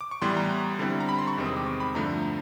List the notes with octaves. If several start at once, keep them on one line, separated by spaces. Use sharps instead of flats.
D6
C#6
A2 E3 G3 B3 C6
A#5
D3 G3 C4 E4
A#5
B5
C6
C#6
E2 C3 D#3 G#3 C4
D#6
D6
C#6
B5
G2 D3 F3 A3 A#5